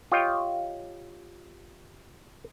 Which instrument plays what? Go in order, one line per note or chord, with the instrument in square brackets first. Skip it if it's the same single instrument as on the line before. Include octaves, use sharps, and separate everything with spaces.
[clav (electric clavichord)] F4 G4 C#5 D#5 F5 G5